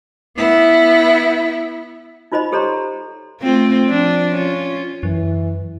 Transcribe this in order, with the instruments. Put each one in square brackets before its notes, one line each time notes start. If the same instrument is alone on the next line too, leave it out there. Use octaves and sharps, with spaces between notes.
[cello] B3 E4
[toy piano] D#4 F4 C5 D#5 B5
G4 A4 C5 C#5 A#5 C6
[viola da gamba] A3 C4 F4
F3 D4
C#4 F4
[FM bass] F#2 [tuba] E3